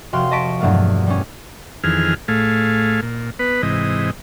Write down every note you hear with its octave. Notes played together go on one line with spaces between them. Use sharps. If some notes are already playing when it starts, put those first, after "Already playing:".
F1 F#4 F5 G5 C6
D#5 A5 C#6 B6 D7
E2 G2 B2 F#3 A3 A#3
G3 C#4
F2 D#3 E3 G#4 F6
A2 A3 G#4 F5
A#2
B3 B4
G#2 C3 E3 D#5